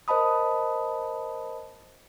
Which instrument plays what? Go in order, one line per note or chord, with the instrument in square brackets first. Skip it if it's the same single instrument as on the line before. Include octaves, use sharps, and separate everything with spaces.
[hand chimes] A#4 C5 D#5 A5 B5 D#6